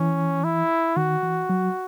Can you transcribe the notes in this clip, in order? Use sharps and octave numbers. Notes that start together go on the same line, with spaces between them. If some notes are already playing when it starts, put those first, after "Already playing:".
Already playing: E3 C#4
E4
D#3 F#4
E3
F#3